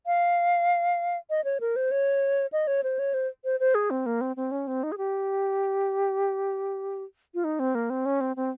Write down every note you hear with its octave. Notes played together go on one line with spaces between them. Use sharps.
F5
D#5
C#5
A#4
C5
C#5
D#5
C#5
C5
C#5
C5
C5
C5
G#4
C4
A#3
C4
C4
C#4
C4
D#4
G#4
G4
F4
D#4
C4
A#3
C4
C#4
C4
C4